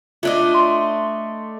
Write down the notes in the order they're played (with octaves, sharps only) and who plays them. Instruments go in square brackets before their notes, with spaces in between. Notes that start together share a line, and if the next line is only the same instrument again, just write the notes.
[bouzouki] A3 D4 D#5 [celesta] F4
[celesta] C6